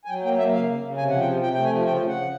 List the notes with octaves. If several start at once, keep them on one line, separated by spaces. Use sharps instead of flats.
G#5
F#3 G5
A#3 G5
A#3 E5
C#3 F5
C#3
C#3
C3 G#5
F3 F#5
G5
C3
C3 G5
A3 G5
G#5
F3
C#3 G5
C#3
F#5
C#3